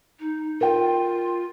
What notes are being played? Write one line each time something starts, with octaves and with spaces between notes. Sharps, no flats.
D#4
F4 A#4 G5